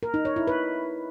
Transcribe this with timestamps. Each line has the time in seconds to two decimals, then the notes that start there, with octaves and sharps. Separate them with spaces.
0.03 A#4
0.14 D#4
0.25 C#5
0.36 E4
0.48 B4